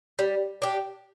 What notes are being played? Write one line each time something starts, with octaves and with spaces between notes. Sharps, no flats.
G3
D4 G4